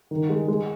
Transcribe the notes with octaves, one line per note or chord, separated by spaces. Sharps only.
D#3
G#3
G#3